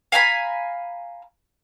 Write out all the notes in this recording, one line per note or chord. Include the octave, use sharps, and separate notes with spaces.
F5 G#5 A#5 B5